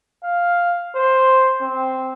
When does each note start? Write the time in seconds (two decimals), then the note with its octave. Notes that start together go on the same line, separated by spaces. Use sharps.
0.24 F5
0.96 C5
1.62 C4